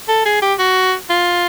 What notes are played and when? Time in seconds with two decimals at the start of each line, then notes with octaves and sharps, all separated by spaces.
0.08 A4
0.26 G#4
0.42 G4
0.59 F#4
1.10 F4